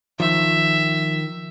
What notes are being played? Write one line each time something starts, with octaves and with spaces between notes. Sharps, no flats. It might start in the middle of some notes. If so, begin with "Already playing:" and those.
D#3 F3 E5